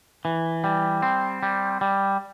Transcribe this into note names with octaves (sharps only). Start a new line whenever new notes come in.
E3
G3
C4
G3
G3